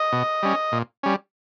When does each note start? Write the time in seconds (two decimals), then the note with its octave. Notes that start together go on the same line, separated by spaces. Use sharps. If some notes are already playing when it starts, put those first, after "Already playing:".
Already playing: D#5
0.12 B2
0.43 G3 C#4
0.72 A#2
1.03 G3 C#4